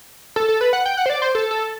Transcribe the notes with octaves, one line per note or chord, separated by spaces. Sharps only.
A4
A4
B4
F#5
G5
F#5
C5
D5
C5
A4
A4